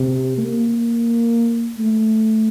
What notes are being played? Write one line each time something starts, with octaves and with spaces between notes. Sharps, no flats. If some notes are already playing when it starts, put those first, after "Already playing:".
Already playing: C3
A#3
A3